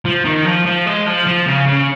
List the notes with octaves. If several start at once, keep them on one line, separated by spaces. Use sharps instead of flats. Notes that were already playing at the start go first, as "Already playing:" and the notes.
F3
D#3
F3
F3
G#3
F3
F3
C#3
C#3